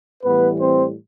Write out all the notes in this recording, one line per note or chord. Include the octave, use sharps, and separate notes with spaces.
A2 E3 G3 B3 B4
C4 C5